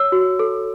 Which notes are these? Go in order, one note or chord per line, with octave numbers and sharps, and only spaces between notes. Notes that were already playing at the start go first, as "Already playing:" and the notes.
Already playing: C#5 E6
F#4
A4